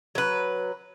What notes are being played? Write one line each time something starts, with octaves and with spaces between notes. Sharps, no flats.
F#3 B4